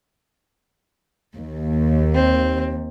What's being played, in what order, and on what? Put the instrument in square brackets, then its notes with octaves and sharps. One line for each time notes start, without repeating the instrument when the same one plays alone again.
[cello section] D#2
[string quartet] C4